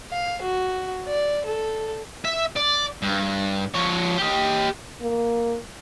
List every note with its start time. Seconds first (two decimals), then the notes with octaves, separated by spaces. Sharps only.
0.12 F5
0.42 F#4
1.07 D5
1.46 A4
2.25 E5
2.56 D5
3.02 G2
3.74 F3 C#5
4.17 G4 D#5
5.01 A#3